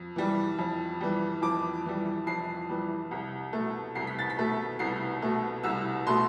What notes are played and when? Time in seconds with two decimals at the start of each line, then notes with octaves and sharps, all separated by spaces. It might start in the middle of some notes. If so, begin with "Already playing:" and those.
Already playing: F2
0.16 E3 G3
0.59 F2
1.01 E3 G3
1.42 F2 D6
1.85 E3 G3
2.27 F2 C7
2.69 E3 G3
3.11 C2
3.53 A3
3.58 B2
3.95 C2 C7
4.07 B6
4.19 A6
4.30 B6
4.38 B2 A3
4.79 C2 C7
5.22 B2 A3
5.64 C2 E6
6.07 B2 A3 C6